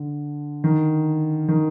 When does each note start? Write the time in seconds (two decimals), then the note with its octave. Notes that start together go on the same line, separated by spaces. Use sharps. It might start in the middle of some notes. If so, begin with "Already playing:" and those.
Already playing: D3
0.64 D#3
1.48 D#3